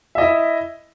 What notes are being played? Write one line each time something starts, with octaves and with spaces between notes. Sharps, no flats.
E4 D#5 E5